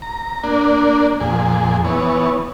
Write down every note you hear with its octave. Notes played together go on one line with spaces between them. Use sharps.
A#5
A#3 D4
F2 A#2 G#4
E3 B3 C#5